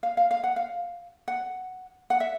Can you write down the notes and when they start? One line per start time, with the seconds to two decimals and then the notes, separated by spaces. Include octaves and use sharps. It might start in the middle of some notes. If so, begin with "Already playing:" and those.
0.03 F5
0.17 F5
0.31 F5
0.44 F#5
0.56 F5
1.28 F#5
2.10 F#5
2.20 E5